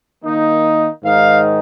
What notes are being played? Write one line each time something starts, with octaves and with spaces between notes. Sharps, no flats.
D#3 A#3 D#4
G#2 D#3 G#3 D#4 F5